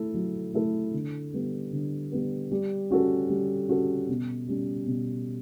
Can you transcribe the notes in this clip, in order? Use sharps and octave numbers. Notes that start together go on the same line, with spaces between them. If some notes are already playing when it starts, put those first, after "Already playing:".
Already playing: A3 E4 A4
F#3
A3 E4 A4
D3
G3 B3
D3
G3 B3
G3
C#4 F#4 A4
G3
C#4 F#4 A4
B2
G3 C#4
B2